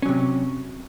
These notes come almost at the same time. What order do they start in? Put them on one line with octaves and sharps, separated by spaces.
C#4 F#3 C3